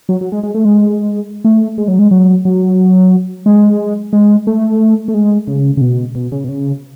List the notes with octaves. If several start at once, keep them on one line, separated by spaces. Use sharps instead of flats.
F#3
F#3
G#3
G#3
A3
G#3
A3
G#3
F#3
G#3
F#3
F#3
G#3
G#3
A3
A3
G#3
C#3
C#3
B2
B2
C#3
B2
C#3